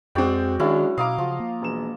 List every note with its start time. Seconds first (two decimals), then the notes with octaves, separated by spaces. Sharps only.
0.15 F2 G#3 C4 F#4 D5 G5
0.59 D#3 F#3 G#3 C#4 D4 E4
0.98 B2 D#5 F5 A#5 D6
1.18 C#3 F3
1.40 A#3
1.62 E1 E7